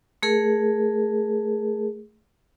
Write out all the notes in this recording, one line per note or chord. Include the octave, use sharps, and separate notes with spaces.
A3 G#4 A#4